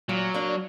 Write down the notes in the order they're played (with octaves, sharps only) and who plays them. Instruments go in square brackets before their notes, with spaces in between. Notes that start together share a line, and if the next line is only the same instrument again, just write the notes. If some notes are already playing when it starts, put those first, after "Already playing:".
[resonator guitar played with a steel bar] A#2 [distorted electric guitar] F#3
[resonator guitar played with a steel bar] A#3 D4